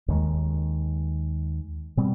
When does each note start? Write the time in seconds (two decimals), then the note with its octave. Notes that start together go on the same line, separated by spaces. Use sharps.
0.08 D#2 D#3 G#3
1.97 B2 G3 C4